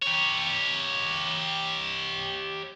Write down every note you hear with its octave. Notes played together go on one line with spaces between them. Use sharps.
G4 C#5